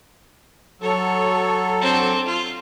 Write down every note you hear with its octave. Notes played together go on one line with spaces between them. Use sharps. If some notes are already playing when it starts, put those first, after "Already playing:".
F#3 A4 C#5
C4 D4
F4